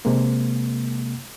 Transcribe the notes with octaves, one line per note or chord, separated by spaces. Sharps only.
C3 G#3 A#3